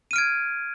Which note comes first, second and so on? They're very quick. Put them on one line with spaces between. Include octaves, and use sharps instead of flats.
D#7 F6 D7 G#6